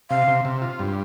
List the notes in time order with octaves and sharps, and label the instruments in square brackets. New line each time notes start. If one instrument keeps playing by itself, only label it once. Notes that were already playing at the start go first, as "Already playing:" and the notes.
[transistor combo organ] C3 [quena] F5
[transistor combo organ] C3
C3
F4
G2